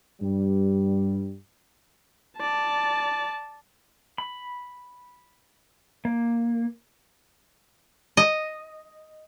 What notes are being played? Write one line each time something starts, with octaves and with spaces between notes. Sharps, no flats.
G2 G3
D5 A5
B5
A#3
D#5